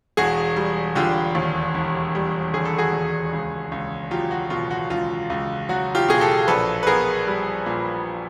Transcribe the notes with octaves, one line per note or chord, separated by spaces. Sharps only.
E1 F#4 G#4
G3
D3 F4 G4
D#2
E1
G3
D3 G#4
A4
F#4 G#4
D#2
C#2
C#2
F#3 F4 G4
F#4
B2 F4
F#4
C#2 F4
C#2
F#3 F#4
F4 G4
B2 G#4
G4 A4
A#1 A4 B4
B4
B3 G#4 A#4
G3
A#2